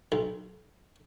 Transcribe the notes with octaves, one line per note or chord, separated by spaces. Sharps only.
B1